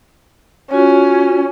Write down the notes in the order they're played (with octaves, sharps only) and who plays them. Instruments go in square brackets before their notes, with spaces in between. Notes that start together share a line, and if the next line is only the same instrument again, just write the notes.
[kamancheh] C#4 [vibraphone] F4 F#4 C#5